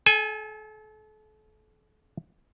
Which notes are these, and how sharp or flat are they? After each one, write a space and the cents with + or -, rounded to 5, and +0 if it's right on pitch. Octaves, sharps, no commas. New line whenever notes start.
A4 -40 G#5 +0